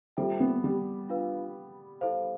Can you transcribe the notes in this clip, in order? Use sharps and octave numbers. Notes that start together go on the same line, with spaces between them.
G3 F4 A4 C5 E5 G5
B3
G3
D4 F4 B4 F5
E4 A4 C5 F5